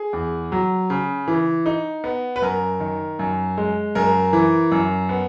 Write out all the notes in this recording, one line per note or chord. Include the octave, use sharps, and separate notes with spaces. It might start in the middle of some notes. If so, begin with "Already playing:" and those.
Already playing: G#4
E2
F#3
C#3
E3
D#4
B3
B4
F#2 A#4
D#3
F#2
G#3
F#2 A#4
E3
F#2
B3